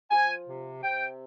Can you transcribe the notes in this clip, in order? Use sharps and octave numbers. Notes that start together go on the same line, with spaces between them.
F3 G#5
C3
C3 G5